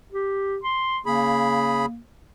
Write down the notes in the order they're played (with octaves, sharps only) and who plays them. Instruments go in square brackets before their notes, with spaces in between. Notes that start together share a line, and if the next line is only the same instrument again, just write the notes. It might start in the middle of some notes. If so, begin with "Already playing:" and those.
[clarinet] G4
C6
[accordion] C#3 G#4 B5 [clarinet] A#3